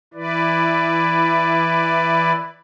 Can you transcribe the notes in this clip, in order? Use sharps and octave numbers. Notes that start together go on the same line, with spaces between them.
E3 E4 B4 D5